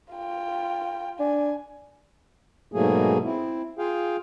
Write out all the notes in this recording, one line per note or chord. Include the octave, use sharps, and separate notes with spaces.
F4 G5
D4 G#5
G#2 B2 F#3 A3 A#3 G#4
C4 E4
F4 G#4 F5 G5